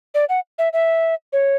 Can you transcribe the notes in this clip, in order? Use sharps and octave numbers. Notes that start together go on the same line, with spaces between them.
D5
F#5
E5
E5
C#5